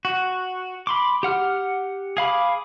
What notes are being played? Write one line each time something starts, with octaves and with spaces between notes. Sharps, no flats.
F#4
B5 C6 D6
G4 F#5 F6
G#4 F5 B5 D6